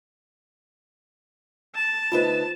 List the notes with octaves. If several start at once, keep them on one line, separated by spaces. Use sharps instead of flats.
A5
D2 D#4 F4 B4 C5